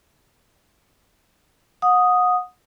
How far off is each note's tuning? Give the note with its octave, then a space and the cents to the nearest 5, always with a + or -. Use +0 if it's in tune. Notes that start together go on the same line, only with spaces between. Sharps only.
F#5 -30 D#6 +0